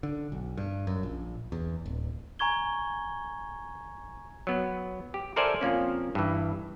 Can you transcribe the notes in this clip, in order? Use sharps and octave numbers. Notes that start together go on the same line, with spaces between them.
D3
B1
G2
F#2
A#1
E2
D1
G#5 A#5 C#6 G#6 G7
F#3 B3
G4
A4 A#4 C5 D5 E5 G#5
F2 F3 A#3 C#4
G2 E3